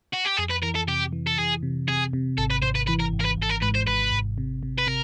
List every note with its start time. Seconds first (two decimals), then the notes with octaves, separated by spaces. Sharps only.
0.14 F#4
0.26 G4
0.38 F2 G#4
0.51 B4
0.63 E3 A#4
0.75 A4
0.88 C3 G4
1.13 E3
1.27 A4
1.38 E3 G#4
1.63 C3
1.88 C3 G#4
2.13 C3
2.38 G#1 A4
2.51 B4
2.63 G#1 C5
2.75 B4
2.87 E3 B4
3.00 A#4
3.13 G#1
3.21 A#4
3.25 B4
3.38 G#1 A4
3.50 A#4
3.62 G#2 B4
3.75 C5
3.87 G#1 B4
4.12 G#1
4.38 C3
4.63 C3
4.78 B4
4.87 C3 A#4